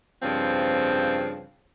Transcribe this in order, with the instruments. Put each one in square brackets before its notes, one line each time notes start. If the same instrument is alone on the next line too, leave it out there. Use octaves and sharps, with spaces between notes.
[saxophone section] G2 C#3 F3 C4